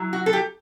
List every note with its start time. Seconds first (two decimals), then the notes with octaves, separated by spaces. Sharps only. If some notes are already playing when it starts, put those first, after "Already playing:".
Already playing: F#3 E4
0.13 F#4
0.26 A4
0.33 G4